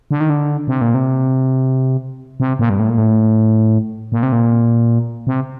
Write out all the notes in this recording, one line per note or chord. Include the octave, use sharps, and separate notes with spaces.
D3
D#3
D3
C3
A#2
C3
C3
A#2
G2
A2
A#2
A2
A#2
C3
A#2
C3